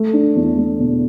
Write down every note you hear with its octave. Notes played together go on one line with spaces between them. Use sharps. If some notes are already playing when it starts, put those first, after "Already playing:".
Already playing: A3
D4
E2
A3
B2